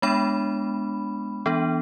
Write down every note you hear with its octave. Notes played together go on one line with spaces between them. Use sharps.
G#3 B3 D4 B5
E3 B3 D4